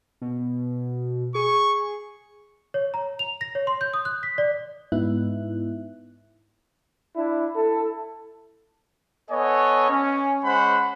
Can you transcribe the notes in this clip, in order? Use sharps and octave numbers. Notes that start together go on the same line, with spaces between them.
B2
G#4 C#6
C#5
A#5
F7
A#6
C#5
C6
G6
D#6
F#6
B6
D5
G#2 B3 D#4 E4 E5 F#6
D4 E4
E4 A4
B3 A4 C#5 D#5 G#5
C#4
G#3 C#4 C5 F#5 B5